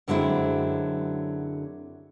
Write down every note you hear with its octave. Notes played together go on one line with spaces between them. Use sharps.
F#2 D3 F#3 G#3 C4 E4